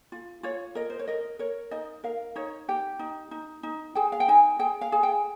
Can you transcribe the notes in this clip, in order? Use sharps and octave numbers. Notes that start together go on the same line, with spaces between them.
F4
F4 C#5
A#4 D#5
C5
C#5
A#4 D#5
A#4 C#5
D#4 D#5
A#4 F5
D#4 C#5
G4 G5
D#4
D#4
D#4
G#4 G5
F5
G5
D#4 G#5
G#4 G5
F5
G#4
G5